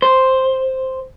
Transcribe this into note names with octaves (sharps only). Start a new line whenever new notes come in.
C5